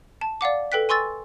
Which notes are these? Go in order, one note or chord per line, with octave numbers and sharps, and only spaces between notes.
A5
D5 F5 F#5 D6
A4 B4 G5 F#6 B6
G#5 C6 C#6 E6 A6